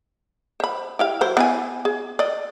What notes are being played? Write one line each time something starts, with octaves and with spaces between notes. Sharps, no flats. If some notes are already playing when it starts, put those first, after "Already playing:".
C5 B5
E4 G4 F5
F#3 E4 C5
B3 E4 G#5
G#4
D5 D#5